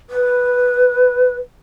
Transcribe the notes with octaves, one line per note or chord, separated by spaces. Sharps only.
B4